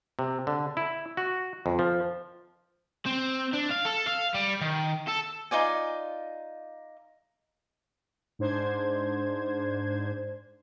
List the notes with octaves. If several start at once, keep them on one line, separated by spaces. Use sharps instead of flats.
C3
D3
E4
F#4
F2
F3
C4
D4
F5
A4
F5
G3
D#3
A4
D#4 F4 D5 G#5
G#2 D4 C5 G#6